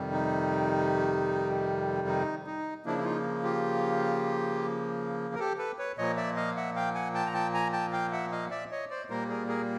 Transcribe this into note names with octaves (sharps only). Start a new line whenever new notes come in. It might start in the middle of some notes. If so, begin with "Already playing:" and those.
Already playing: F2 C3 D#3 G3
D#4
D#4
D#4
C#3 F3 A#3 D4 E4
E4
D#4 F4
F4 G4
A#4
G4 A4
A4 B4
B4 C#5
A#2 F3 A#3 C#5 D#5
D5 E5
D#5 F5
E5 F#5
F5 G5
F#5 G#5
G5 A5
A#5
G5 A5
G#5 A#5
G5 A5
F5 G5
E5 F#5
D#5 F5
D5 E5
C#5 D#5
C5 D5
A#2 G3 A#3 A#4 C5
G#4 A#4
G#4 A#4